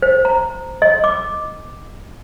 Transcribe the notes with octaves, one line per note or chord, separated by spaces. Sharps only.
C5
A#5
D#5
D6